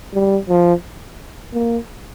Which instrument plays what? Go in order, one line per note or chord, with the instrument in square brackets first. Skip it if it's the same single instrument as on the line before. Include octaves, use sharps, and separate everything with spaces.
[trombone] G3
F3
A#3